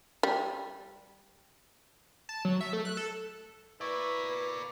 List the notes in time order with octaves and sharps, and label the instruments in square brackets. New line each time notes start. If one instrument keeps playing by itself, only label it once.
[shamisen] G3
[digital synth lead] A5
F#3
E5
A3
F#6
A4
[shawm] E4 [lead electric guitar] A#4 D5 [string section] B4 [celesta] C#6